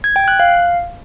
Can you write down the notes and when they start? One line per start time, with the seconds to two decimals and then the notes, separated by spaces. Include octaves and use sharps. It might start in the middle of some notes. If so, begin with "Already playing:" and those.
0.04 G#6
0.16 G5
0.28 F#6
0.40 F5